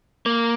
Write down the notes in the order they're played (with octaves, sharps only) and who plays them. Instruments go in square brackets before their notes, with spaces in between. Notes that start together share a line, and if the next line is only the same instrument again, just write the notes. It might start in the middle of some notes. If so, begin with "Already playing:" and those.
[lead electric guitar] A#3